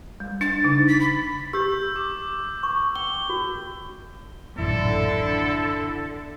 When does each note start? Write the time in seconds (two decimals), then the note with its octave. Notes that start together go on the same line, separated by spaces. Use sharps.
0.20 G3
0.41 D4 A6
0.64 C#3 D#4
0.88 B6
1.01 B5
1.53 G4 E6 G6
1.96 D6
2.63 C#6
2.96 G5 G7
3.29 F#4
4.58 A1 F#2 A#2 D3 E4 A4